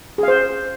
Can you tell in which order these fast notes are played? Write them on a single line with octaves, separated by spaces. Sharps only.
G#4 F5 C5